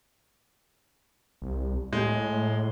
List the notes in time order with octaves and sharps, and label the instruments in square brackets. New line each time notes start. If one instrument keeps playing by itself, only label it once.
[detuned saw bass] C2
[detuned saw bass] A2 [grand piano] G#3